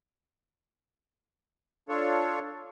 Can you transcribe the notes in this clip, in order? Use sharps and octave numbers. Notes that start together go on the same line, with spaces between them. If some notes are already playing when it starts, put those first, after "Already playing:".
D4 F4 A4 C#5